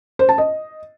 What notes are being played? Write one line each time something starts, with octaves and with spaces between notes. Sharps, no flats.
C5
A5
D#5